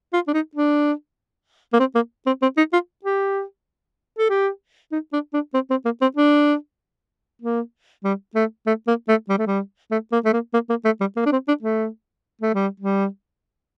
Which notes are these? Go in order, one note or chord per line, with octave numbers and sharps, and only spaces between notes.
F4
D4
D#4
D4
A#3
C4
A#3
C4
C4
D#4
F4
G4
A4
G4
D#4
D4
D4
C4
C4
A#3
C4
D4
A#3
G3
A3
A3
A#3
A3
G3
A3
G3
A3
A#3
A3
A#3
A#3
A#3
A3
G3
A#3
D4
C4
D4
A3
A3
G3
G3